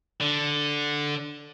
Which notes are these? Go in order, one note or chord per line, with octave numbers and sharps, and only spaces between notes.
D3